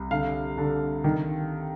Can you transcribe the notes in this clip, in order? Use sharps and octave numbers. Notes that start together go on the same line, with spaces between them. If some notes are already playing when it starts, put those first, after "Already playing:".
Already playing: C2
D3 F5
D3
D#3